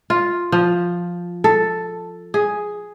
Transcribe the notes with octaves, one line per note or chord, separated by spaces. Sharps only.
F4
F3
A4
G#4